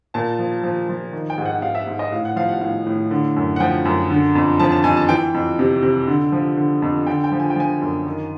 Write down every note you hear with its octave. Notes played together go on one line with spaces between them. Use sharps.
A#2 A5
F3
F3
F3
D#3
G5
G#2
F#5
G#2 F5
E5
G#2
D#5
A2 F5
F#5
F3 F5
F#5
A2 F5
A2
D3
F#2
F#5
F3 G5
F#2
D3
F2
F3 A5
A5
F2 G#5
A5
E3 G5
F2
C3
C3
D3
F3
D3
F2
D3 G5
G5
F3
G#5
G5
F3 G#5
F#2
D#3